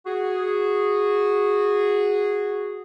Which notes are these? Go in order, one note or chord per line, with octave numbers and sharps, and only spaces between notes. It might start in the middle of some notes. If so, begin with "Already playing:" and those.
F#4 G#4